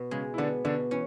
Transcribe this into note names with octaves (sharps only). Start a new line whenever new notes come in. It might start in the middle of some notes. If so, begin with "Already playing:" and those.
Already playing: B2 B3
C#3 G#3 C#4
E4
D3 B3 D4
B2 D3 D4
E3 C#4